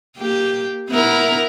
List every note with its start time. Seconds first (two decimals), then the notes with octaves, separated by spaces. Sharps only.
0.17 A#3 G4
0.89 B3 E4 A#4